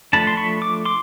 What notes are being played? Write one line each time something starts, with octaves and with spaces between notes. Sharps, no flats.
F3 A3 D4 A5 B5
C6
B5 C#6
D6
C6 D6